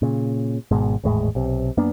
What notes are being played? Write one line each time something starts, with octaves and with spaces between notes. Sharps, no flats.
A#2 C#3
G#1 G#2 B2 G#3
G#1 E2 A2 G#3
B1 C3
F#2 A#3 B3 D4